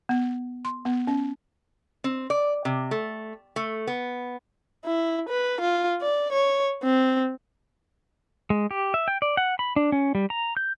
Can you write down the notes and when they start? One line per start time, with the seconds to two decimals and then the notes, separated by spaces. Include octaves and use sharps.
0.09 B3
0.65 C6
0.85 B3
1.07 C#4
2.04 C4
2.30 D5
2.65 C3
2.91 A3
3.56 A3
3.87 B3
4.85 E4
5.29 B4
5.61 F4
6.01 D5
6.32 C#5
6.84 C4
8.50 G#3
8.71 G4
8.94 E5
9.08 G5
9.22 D5
9.37 F#5
9.59 B5
9.76 D4
9.92 C#4
10.15 G3
10.30 A#5
10.57 G6